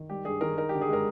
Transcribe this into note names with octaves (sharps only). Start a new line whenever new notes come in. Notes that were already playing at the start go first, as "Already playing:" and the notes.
Already playing: D#3
G3 G4
G2 G#4
D#3 A#4
D#4 A#4
D3 G4
G#4
G#3 A#4